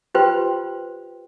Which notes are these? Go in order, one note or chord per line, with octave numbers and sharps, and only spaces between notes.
F4 G4 B4 C5 G5 C6